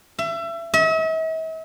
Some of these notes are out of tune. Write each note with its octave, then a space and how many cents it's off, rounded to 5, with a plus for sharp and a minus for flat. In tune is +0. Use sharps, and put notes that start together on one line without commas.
E5 +30
E5 -45